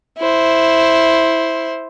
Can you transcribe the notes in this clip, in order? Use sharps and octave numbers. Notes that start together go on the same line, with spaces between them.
E4 C5